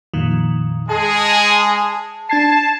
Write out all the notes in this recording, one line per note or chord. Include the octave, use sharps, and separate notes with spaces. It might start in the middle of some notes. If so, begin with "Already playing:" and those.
F2 A#2 D#3
G#3 G#4 A5
D4 A5 G#6 C7